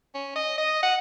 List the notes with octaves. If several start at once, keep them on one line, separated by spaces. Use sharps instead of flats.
C#4
D#5
D#5
F#5